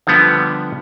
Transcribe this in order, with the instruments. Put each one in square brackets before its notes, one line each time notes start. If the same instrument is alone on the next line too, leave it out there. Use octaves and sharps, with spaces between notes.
[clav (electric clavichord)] D3 F3 G3 B3